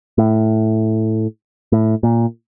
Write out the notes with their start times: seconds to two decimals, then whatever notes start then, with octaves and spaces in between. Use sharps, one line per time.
0.18 A2
1.72 A2
2.03 A#2